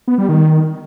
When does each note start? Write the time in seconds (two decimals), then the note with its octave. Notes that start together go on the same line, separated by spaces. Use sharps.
0.08 B3
0.18 G3
0.29 D#3